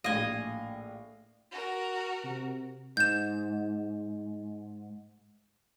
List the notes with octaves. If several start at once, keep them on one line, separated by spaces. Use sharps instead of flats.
A#1 A2 D#5 F5 G#5
F#4 A#4
C3
G#2 G6 E7